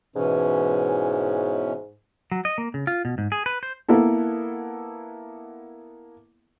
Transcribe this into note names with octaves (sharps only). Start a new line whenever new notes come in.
G#2 B2 E3 C#4
F#3
D#5
A#3
C#3
F4
B2
G#2
G#4
B4
C5
A#3 B3 E4 A4